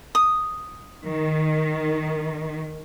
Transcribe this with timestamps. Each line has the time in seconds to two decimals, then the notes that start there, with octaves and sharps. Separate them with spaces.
0.15 D#6
1.05 D#3